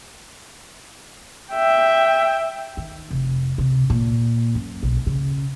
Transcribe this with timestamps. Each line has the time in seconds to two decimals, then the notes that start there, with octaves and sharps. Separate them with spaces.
1.52 E5 G5
2.77 D#3
3.10 F1
3.58 C3
3.90 A#2
4.55 F#2
4.83 B1
5.07 C#3